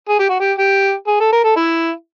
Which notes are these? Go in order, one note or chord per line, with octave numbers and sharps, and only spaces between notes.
G#4
G4
F#4
G4
G4
G#4
A4
A#4
A4
E4